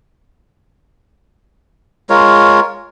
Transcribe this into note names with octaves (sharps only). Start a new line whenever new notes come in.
G#3 F4 A#4 C#5